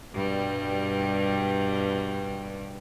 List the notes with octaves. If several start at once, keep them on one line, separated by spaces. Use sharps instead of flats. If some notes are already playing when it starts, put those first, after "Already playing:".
G2 B2 G3